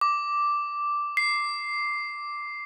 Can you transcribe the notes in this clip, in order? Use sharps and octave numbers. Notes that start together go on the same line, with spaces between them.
D6
C7